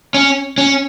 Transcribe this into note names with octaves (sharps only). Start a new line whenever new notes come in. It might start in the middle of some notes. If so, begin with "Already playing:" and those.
C#4
C#4